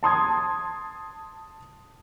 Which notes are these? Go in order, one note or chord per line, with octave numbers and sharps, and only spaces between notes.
A5 C6 D#6 G#6